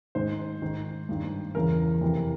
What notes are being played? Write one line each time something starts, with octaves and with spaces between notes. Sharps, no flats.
G#2 D#3 C5
G#2 D#3
G2 D#3
E2 C#3 E3 A#4
F2 C3 E3